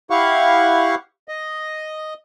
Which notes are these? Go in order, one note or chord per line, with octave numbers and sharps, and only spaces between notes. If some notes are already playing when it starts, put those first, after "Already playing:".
E4 G4 F5 F#5 C#6
D#5